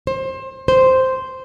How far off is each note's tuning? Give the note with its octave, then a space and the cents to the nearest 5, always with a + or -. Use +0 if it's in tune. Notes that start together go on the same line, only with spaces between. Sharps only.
C5 +25
C5 -5